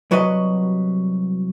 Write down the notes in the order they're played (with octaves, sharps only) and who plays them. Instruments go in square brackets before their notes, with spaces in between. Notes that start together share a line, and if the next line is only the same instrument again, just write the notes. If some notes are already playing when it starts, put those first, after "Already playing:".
[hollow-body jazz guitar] C2 F#3 F#4 B4 D#5